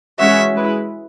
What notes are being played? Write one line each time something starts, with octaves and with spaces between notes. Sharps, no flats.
E3 G#3 C#4 F#4 C#5 E5
G#3 E4 B4